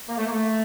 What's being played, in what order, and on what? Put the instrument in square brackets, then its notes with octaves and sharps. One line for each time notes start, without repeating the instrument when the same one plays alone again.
[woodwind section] A#3
A3
A#3
A3